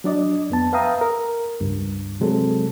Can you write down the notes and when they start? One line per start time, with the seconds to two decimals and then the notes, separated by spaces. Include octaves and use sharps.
0.04 F#3 D4 D5 D#5
0.50 F2 B3 A5
0.73 B4 E5 F5 G5 A#5 D#6
1.01 A#4
1.60 C#2 G2
2.20 C3 F#3 G#3 C4 A4